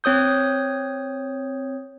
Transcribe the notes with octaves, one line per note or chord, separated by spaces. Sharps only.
C4 C#5 D#6 G6